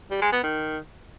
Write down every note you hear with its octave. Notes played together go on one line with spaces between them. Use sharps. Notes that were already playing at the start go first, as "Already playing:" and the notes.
G3
G#3
B3
D#3